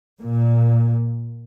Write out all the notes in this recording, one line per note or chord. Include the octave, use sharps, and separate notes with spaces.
A#2